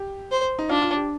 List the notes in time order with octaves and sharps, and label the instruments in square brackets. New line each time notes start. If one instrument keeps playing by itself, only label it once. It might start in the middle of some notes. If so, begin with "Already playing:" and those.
Already playing: [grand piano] G4
[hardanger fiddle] C5
[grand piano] D#4
[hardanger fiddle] D4 [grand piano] F4
[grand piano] F4
G4